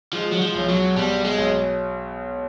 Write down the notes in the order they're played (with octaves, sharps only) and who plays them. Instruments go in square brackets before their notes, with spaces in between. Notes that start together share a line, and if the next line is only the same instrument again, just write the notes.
[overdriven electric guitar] F3 [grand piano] G#3
[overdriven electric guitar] F#3
F3
[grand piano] B1
[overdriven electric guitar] F#3
[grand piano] B2 [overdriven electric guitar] G3
[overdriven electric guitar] G#3
[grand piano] B1